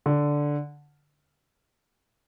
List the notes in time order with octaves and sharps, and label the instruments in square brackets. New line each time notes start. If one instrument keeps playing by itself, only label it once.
[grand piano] D3